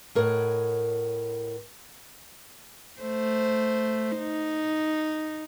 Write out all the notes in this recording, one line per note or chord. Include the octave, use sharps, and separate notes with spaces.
A2 A#4 C#5 D#5 F#5
A3 C5
D#4